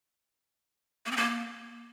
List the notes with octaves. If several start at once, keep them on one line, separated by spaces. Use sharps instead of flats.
A#3
C4
A#3